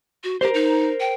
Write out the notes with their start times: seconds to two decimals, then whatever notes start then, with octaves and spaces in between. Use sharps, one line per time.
0.24 F#4
0.41 G4 A#4 C5
0.54 D#4
1.00 G5